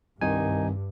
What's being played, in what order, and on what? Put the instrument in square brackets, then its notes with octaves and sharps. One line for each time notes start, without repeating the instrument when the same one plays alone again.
[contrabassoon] C2 [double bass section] G2 [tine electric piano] D#3 D#4 G#5